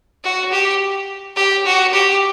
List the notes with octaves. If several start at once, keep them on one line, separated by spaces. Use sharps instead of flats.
F#4
G4
G4
F#4
G4